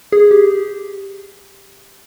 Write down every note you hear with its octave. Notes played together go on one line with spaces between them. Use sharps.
G#4
G4